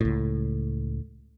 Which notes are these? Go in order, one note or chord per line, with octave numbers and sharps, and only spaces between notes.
C#2 A2